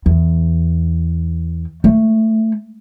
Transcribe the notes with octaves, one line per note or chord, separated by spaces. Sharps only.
E2
A3